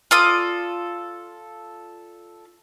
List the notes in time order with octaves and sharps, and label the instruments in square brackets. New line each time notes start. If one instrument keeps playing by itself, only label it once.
[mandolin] F4 A4 D5 D#6